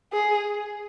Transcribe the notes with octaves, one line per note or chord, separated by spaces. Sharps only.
G#4